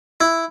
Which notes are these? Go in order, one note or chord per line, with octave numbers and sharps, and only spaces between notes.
E4